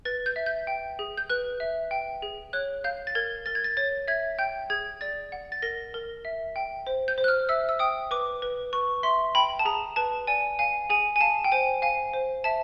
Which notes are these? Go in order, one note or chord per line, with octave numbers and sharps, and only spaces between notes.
B4 A6
G6
E5
G6
G5
G#4
G6
B4 F#6
E5
G5
G#4
C#5 F#6
F5 G6
A6
A#4 G#6
A#4 A6
G#6
A6
C#5 A6
E5 G#6
G5 G6
G#4 G#6
D5 A6
F#5
A6
A#4 A#6
A#4
E5
G5
C5
G6
C5
F#6
F6
E5 E6
E6
G5 D#6
B4 D6
B4
B4 C#6
E5 C6
G5 B5
A5
G#4 A#5
B4 A5
D5 G#5
F5 G#5
G#4 G#5
G#5
F5 A5
G5
C5 G#5
F5 G#5
C5
E5 A5